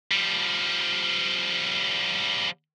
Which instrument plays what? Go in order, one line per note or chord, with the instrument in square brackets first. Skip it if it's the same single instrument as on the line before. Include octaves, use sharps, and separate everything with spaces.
[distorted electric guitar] F3 G3